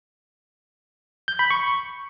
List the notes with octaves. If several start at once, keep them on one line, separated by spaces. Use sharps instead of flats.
G6
B5
C#6